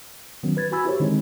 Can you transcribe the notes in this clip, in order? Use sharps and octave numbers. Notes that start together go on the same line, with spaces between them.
D#3 F#3 B3 C#4
B4 G#6 A6
E4 F#4 G#5 B5 E6 G#6
E4 G4 A#4 C5 C#5
D3 D#3 G#3 C4 D#4